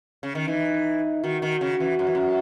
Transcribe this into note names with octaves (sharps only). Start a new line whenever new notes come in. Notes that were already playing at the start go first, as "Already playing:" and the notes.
C#3
D#3
E3 D#4
D#3 F#4
D#3
C#3
E3
F#2
E3
F#2